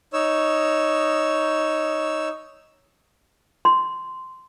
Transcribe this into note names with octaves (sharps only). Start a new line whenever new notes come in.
D#4 C#5 E6
C6